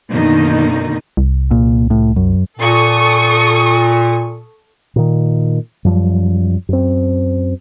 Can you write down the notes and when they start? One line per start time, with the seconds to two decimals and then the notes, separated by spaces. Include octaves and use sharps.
0.12 F#2 B2 D3 D#3 A#3 D#4
1.17 C2
1.51 A#2
1.90 A2
2.16 F#2
2.60 A#2 A4 C#6 D#6
4.96 A#2 D#3
5.84 F#2 F3 G3
6.69 F#2 C4